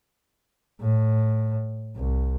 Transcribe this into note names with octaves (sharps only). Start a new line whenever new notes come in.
A2
C2